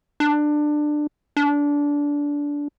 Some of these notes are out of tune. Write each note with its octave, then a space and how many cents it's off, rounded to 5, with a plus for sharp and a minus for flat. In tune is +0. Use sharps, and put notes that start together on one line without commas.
D4 +20
D4 -20